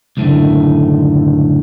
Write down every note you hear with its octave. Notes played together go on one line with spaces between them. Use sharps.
C#2 F#2 A2 D3 D#3 A3